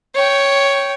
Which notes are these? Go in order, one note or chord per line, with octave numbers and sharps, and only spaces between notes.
C#5 G5